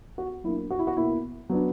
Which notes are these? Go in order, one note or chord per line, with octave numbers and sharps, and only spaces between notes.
F#4
F#3 A#3 D4 E4
F#4
E4
F#4
B2 A#3 E4
F#3 B3 D4